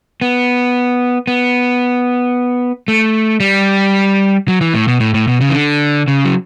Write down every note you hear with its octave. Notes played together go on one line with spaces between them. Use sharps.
B3
B3
A3
G3
F#3
E3
A2
B2
A2
A2
B2
C#3
E3
D3
C#3
F#3